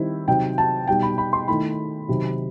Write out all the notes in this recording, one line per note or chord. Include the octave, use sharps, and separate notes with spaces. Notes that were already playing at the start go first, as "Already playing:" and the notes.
Already playing: D#3 G3 C4 E4
C3 F#3 C4 D#4 G5
A5
B2 G3 D#4 G5
B5
B5
C6
D#3 A3 E4 B5
C3 D#3 F#3